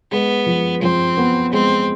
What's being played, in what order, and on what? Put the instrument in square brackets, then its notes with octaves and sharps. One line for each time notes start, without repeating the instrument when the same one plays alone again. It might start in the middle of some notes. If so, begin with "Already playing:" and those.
[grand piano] G#3 [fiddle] B3
[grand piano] F3
[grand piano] F3 [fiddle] C4
[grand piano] B3
[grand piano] G#3 [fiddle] C4